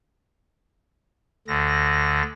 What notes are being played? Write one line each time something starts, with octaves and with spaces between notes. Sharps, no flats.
D2 D3 A#6